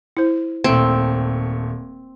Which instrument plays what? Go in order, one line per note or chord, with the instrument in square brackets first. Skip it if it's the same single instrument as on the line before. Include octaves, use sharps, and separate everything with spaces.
[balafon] E4 C5
[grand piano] D#1 A3 [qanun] C4